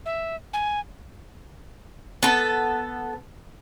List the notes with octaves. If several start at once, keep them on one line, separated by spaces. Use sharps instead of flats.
E5
G#5
B3 A4